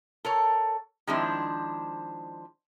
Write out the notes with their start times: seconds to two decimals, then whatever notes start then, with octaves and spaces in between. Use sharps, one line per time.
0.25 A4 A#4 C#5
1.07 D#3 F3 G#3 C4 D4 E4